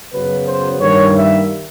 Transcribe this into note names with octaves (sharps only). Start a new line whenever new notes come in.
F#2 C#3 F#3 B3 B4
C5
G2 D#3 G3 A#3 C#5
E5